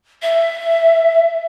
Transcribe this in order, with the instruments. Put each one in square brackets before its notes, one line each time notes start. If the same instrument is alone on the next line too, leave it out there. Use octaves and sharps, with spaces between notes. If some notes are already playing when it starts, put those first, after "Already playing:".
[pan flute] E5